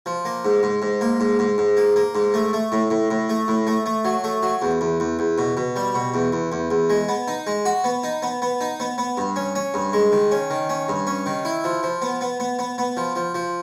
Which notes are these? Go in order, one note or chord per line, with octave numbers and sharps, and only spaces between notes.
F3
A#3
G#2
G#2
G#2
A#3
G#2
G#2
G#2
A#3
A#3
G#2
A3
A3
A2
A2
A2
A3
A2
A3
A3
F#3
A3
F#3
E2
E2
E2
E2
B2
B2
G3
B2
E2
E2
E2
E2
G#3
B3
D#4
G#3
F#4
B3
D#4
B3
B3
D#4
B3
B3
G2
C#4
C#4
G2
G#3
D#3
C#4
D#3
C#4
G2
C#4
D#3
E4
F3
F3
B3
B3
B3
B3
B3
F3
F3
F3